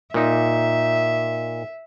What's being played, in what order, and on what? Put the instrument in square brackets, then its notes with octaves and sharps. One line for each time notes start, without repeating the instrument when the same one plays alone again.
[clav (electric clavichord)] A#2 D#4 [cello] E5